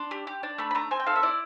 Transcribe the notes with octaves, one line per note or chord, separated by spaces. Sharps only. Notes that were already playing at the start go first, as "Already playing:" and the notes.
Already playing: D4 C6
G4
G4
D4
A3 B5
B5
A3 A#5
C4 G#5
G5
A4 F5
E5
E4 D5